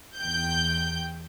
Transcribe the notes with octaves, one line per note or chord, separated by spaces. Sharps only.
E2 G5 G6